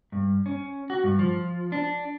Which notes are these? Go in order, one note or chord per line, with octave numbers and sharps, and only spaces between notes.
G2
C#4
F#4
G2
F3
D4